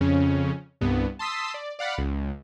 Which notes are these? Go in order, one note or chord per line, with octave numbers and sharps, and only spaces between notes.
F2 C#3 C#4
C2 G2 B3
A5 C6 D#6 E6 B6
D5
D5 F5 F#5 B5
C#2